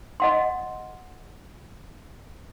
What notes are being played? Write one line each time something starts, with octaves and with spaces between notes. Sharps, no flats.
D#5 F#5 C6